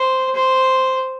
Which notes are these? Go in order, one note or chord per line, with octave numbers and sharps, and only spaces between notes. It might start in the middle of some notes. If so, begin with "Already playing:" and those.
Already playing: C5
C5